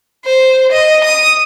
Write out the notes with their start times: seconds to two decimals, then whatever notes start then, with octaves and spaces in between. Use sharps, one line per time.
0.25 C5
0.72 D#5
1.04 D#6